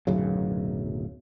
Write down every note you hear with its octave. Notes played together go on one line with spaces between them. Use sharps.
D1 B1 F#2 C#3